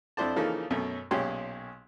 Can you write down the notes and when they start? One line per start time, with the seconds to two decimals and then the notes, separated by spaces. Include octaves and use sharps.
0.17 F2 D4 E4 C5 D5 A5
0.36 C#3 E3 F3 A#3 D#4 A4
0.70 F#2 B2 A3 C#4
1.11 B1 A#2 C#4 G4 G#4 C6